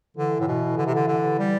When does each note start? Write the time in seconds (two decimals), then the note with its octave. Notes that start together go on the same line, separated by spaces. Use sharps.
0.17 D3 E3
0.40 A2
0.48 B2
0.78 D3
0.87 C3
0.95 D3
1.08 D3
1.39 G3